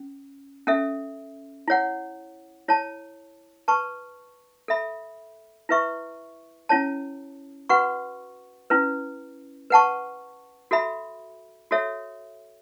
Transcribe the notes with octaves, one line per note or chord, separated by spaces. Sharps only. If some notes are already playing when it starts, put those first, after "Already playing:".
Already playing: C#4
C#4 A4 E5
E4 C#5 F#5
E4 C#5 A5
B4 A5 C#6
A4 E5 B5
E4 B4 E5 C#6
C#4 E4 C#5 A5
F#4 B4 F#5 C#6
C#4 E4 B4
B4 F#5 A5 C#6
F#4 A4 E5 B5
F#4 A4 C#5 E5